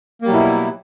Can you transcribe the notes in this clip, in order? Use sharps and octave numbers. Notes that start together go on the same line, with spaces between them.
B2 F#3 G3 A#3 E4